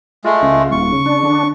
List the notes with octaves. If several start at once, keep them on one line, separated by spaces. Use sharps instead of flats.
G#3 A3 F4
C#2
D#1 C#6
C#3
D4
D3